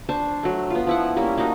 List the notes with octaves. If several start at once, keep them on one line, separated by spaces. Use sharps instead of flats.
D4 C5 C#6
F#3 A3
B3 F4
F3 E4 F#5
G3 A#3 C#4 E4
A#3 D4 D#4 F#4